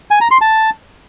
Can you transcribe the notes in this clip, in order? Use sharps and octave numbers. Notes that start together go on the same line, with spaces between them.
G#5
A#5
C6
A5